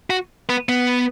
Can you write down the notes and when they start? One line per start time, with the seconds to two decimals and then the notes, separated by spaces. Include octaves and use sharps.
0.10 F#4
0.49 B3
0.69 B3